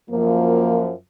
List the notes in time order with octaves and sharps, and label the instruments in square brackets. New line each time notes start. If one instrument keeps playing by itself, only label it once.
[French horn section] F#2 F3 [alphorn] A#3